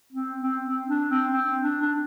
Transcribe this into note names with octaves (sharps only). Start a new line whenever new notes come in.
C4
C4
C4
D4
C4
C4
D4
D4